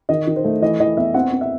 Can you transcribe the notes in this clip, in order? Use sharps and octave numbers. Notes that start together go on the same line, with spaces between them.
D#3 D#5
D#3
C5
A3
E3 D#5
E3 D#5
B3 E5
C4 F#5
C4
E5